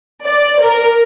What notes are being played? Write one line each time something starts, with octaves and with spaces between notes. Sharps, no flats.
D5
A#4